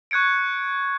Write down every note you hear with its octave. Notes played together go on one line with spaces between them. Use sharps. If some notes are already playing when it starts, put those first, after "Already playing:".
C#6 F#6 G#6 C#7 D7